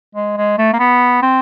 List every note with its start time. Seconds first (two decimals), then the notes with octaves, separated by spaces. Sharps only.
0.15 G#3
0.37 G#3
0.58 A3
0.73 A#3
0.79 B3
1.23 C4